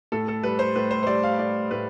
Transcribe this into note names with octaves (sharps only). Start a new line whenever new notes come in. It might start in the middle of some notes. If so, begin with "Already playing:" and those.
A2 A4
A4
G3 B4
C5
A2 B4
C5
C5
G3 D5
F5
A2 D5
A2 B4